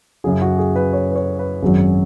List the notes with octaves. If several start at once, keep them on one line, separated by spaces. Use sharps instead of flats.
F#2 C#3 F#3 G#4
F#4
G#4
B4
C#5
B4
C#5
B4
G#1 F#2 F#3 G#4